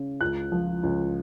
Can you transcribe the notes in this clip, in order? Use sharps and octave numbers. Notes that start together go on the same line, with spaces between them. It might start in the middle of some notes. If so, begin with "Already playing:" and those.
Already playing: C#3
C#2 F#6
F3
C#2